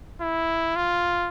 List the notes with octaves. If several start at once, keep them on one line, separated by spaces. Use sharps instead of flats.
E4
F4